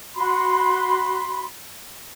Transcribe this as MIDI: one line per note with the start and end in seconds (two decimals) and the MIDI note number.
0.15 1.42 66
0.15 1.42 83
0.15 1.42 84